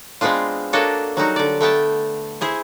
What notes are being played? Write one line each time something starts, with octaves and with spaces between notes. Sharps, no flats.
G#3 B3 C4 D4 F4
A#3 D4 F#4 A4 C#5 D#5
F#3 G3 D#4 F#4
D3 D5
A3 B3 G5 A5
E4 G#4 C5